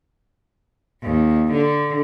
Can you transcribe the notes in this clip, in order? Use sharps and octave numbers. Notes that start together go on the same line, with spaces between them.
D#2
D3